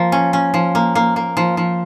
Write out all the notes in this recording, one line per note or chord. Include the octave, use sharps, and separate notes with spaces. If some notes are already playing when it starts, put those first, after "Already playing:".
Already playing: F3 A#3
C#4
C#4
F3
A#3
A#3
A#3
F3
F3